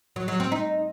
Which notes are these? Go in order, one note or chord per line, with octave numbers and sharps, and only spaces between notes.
F#3
F#3
C4
D#4